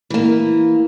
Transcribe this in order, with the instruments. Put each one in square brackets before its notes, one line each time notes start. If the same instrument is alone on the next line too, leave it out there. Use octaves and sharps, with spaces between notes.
[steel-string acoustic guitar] E3 A#3